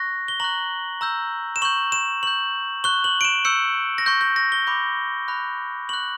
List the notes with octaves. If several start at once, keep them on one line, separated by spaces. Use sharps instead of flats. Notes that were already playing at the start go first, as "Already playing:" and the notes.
Already playing: C#6 F#6 A#6
G7
A#5 C#6 F#6 F#7
A#5 E6 G6
E7
C#6 G6 F#7
E7
C#6 G6 F#7
C#6 F#6 G7
F#7
D7
E7
C#6 E6 G6 C#7
A#6
C#6 G6
G6
A#6
G7
B5 D6 G6
B5 F#6
C#6 F#6 F#7